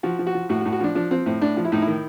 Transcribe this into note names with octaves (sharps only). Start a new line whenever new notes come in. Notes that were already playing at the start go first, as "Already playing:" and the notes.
F3 F#4
F3
F#4
F3
A2 F#4
F#4
A2
F#4
F3 D4
F3 D4
F3 C4
A2 C4
A2 D4
F3
E4
A2 D#4
E4
D#3